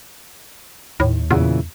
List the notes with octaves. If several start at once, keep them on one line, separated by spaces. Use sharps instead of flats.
D#2 A2
E2 A#2 C#3 E3